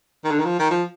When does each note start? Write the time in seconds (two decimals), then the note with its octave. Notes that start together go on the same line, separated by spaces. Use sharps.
0.24 D#3
0.31 D3
0.39 D#3
0.45 F3
0.59 D#3
0.71 F3